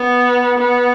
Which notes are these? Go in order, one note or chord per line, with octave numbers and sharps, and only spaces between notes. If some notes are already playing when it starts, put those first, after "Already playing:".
Already playing: B3
B3